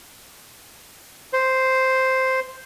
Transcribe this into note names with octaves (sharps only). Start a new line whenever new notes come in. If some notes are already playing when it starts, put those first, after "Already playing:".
C5